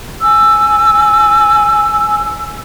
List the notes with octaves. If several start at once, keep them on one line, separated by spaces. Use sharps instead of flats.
G#5 E6